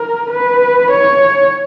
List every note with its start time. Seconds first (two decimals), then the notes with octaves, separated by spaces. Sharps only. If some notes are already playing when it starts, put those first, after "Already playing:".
Already playing: A#4
0.31 B4
0.91 C#5